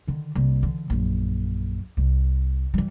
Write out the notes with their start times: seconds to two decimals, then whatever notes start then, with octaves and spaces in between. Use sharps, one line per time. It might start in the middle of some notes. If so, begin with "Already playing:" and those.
0.08 D3 D#3
0.35 C2 A#3
0.63 D3 E3
0.90 A#1 F#2
1.97 C2
2.74 E3 G3